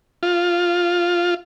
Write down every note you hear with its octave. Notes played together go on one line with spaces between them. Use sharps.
F4